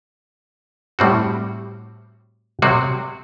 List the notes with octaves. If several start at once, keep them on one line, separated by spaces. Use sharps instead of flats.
A2 G3 C4 F#4
C3 F#3 C4 F#4